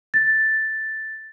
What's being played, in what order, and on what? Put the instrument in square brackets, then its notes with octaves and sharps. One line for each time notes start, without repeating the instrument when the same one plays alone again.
[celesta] A6